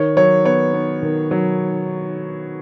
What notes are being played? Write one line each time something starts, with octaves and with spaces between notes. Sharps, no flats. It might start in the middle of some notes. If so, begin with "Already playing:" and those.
Already playing: D#3 C#5
F#3 C#5
B3 C#5
B3
D#3
F#3